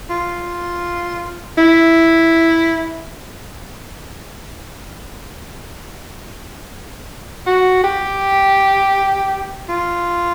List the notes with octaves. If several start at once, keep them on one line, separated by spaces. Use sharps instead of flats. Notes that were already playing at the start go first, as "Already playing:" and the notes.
F4
E4
F#4
G4
F4